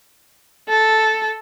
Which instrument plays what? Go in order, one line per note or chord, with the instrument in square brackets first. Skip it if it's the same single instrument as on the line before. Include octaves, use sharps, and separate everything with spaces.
[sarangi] A4